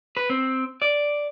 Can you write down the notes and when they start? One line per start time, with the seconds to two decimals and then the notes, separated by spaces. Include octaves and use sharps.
0.17 B4
0.30 C4
0.82 D5